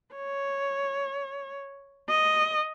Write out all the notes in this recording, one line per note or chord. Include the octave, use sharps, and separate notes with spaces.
C#5
D#5